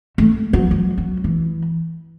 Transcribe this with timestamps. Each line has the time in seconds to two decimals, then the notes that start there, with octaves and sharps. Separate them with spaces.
0.18 A3
0.53 F#3
0.71 F#3
0.98 F#3
1.24 E3